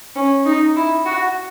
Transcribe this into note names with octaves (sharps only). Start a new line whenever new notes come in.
C#4
D#4
E4
F#4